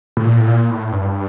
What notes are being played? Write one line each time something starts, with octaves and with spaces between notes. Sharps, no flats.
A2
A#2
A2
A#2
A2
G2